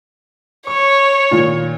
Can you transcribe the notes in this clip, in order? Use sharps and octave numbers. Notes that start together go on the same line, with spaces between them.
C#5 C#6
A#2 D#3 F4